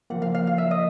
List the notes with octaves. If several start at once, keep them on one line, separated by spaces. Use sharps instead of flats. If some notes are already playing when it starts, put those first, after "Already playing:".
C#3 F3 A#3 F#5
F5
F5
F5
E5
D#5